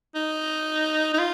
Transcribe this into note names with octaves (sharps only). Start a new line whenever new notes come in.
D#4
D#4
F4